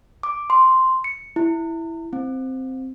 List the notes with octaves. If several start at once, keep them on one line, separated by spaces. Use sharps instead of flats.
D6
C6
C#7
E4
C4